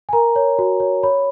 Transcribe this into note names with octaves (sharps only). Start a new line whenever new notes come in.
G#5
A#4 A#5
C#5
F#4
C#5
C#5 B5